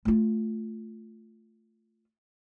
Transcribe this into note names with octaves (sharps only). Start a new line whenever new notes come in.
A3 F4